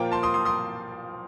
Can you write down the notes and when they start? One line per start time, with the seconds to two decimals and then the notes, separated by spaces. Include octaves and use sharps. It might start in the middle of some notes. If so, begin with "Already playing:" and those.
Already playing: A#2 F3 A#3 G5 A#5
0.12 A5 C6
0.23 C6 D#6
0.34 C6 D#6
0.45 C6 D#6